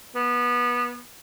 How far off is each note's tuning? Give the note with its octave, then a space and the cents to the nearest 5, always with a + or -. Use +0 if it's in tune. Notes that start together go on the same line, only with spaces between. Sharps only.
B3 -20